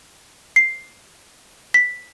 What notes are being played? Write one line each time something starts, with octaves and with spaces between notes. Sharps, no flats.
C7
B6